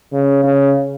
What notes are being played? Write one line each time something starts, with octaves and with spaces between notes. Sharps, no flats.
C#3
C#3